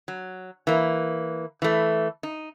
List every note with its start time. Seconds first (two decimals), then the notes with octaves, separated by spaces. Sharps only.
0.08 F#3
0.67 E3 A#3
1.62 E3 A3
2.23 D#4